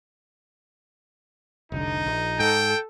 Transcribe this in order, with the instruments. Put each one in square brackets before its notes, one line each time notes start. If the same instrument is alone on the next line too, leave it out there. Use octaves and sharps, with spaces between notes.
[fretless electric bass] F1 C2 D3 [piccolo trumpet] D#4
[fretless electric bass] A#1
[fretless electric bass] G#2 [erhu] A4 [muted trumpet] G5